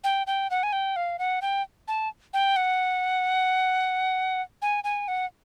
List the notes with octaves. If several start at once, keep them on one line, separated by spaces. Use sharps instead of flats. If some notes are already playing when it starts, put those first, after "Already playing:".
G5
G5
F#5
G#5
G5
F5
F#5
G5
A5
G5
F#5
G#5
G#5
F#5